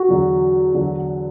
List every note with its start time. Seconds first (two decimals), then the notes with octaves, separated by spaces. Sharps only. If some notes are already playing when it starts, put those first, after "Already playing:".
Already playing: F#4
0.09 E2 D3 F#3
0.74 E2 D3 F#3